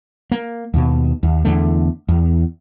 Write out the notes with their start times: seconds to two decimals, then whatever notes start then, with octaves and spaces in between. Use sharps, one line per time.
0.31 A#3
0.74 D#2 B2
1.23 D#2
1.45 E2 D3 A3
2.09 E2